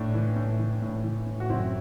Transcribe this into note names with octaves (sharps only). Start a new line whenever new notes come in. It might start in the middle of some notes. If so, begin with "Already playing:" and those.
Already playing: A2 D4
E3
A2
E3
A2
E3
A2
F#4
F#2 C4 E4